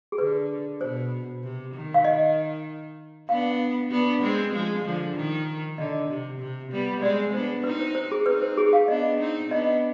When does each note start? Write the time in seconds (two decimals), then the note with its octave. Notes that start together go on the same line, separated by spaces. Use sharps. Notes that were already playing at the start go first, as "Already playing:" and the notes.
0.12 G#4
0.18 D3 B4
0.80 B2 C5
1.43 C3
1.74 D#3
1.94 F5
2.04 D#5
3.29 B3 D4 F5
3.91 B3 D4
4.22 G#3 C4
4.54 F3 G#3
4.85 D3 F3
5.16 D#3
5.78 D3 D#5
6.09 C3
6.39 C3
6.71 G3 B3
7.02 G#3 C4 D5
7.34 B3 D4 C5
7.64 C4 D#4 B4
7.80 C5
7.95 C5
8.12 G#4
8.26 C4 D#4 B4
8.42 C5
8.57 G#4
8.73 F5
8.88 B3 D4 D#5
9.20 C4 D#4
9.51 B3 D4 D#5